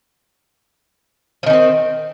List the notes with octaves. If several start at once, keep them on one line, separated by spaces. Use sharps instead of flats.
D#3 F3 C4 C#4